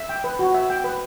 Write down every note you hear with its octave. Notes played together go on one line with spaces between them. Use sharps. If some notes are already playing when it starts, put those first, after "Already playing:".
Already playing: E5
G5
B4
F#4
E5
G5
B4